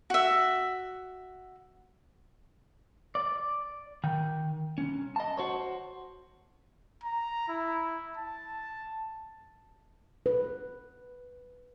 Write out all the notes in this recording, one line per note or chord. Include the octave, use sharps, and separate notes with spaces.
F#4 E5
D5
D#3 G5
C2 C#4
D#5 A5
F#4 C5 C#5
A#5
E4
A5
B4